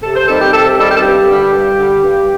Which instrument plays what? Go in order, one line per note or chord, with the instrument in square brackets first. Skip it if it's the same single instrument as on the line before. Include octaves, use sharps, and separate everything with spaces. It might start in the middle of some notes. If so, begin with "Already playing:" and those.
[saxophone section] C3 A4
C5
D#3 G3 C4 A4
G4
C3 A4
D#3 G3 C4 A4
G4
A4
G2 G4
D3 G3
G2
D3 G3
G2